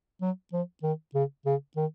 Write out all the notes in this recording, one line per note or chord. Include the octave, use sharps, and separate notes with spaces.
F#3
F3
D#3
C#3
C#3
D#3